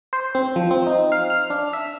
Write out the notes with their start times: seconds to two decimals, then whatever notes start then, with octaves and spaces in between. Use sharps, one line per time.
0.13 C5
0.35 C4
0.56 F3
0.71 C4
0.87 D#4
1.12 F5
1.30 F6
1.50 D4
1.73 E5